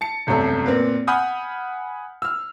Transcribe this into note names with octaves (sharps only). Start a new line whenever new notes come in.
A5 C#7
E1 C2 F#2 A3 A4
A#2 C4 A#4 B4
F#5 G#5 B5 D#6 F6 G6
E6 F6